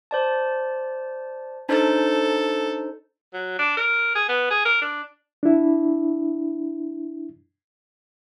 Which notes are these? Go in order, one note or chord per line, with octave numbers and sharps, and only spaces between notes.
C5 D5 A5
D4 D#4 A4 C5
F#3
D4
A#4
G#4
B3
G#4
A#4
D4
D4 E4